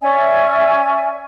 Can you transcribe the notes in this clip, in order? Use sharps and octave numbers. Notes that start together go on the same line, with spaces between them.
C#4 D5 E5 G#5